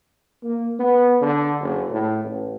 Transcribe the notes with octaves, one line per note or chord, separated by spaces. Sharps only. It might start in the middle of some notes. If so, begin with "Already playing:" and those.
A#3
B3
D3
F#1
A2
A1